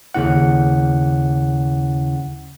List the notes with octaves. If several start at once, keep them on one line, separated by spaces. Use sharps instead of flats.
D#2 C#3 C#4 E4 F#5